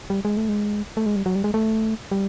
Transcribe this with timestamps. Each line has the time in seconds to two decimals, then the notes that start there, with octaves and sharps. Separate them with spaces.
0.10 G3
0.25 G#3
0.37 A3
0.49 G#3
0.97 A3
1.06 G#3
1.16 G3
1.26 F#3
1.36 G3
1.44 G#3
1.54 A3
2.11 G3